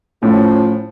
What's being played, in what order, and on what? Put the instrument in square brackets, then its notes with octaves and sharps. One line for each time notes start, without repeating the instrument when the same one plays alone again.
[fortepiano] A2 [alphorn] F3 [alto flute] C#4